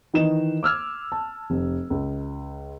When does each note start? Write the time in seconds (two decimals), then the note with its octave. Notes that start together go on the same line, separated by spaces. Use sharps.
0.13 D#3 E3 D#4 D#5 E7
0.63 D6 E6 F6 G#6
1.12 A5
1.50 F1
1.90 C#2